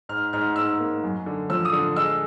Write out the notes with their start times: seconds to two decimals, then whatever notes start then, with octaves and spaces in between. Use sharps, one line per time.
0.09 G#2 F6
0.33 G#2 F6
0.56 G#2 E6
0.80 A#3
1.04 F#2
1.26 D3
1.50 F3 E6
1.65 D#6
1.72 D3
1.96 G#3 E6